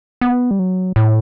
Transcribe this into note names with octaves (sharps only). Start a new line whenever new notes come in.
B3
G3
F#3
A2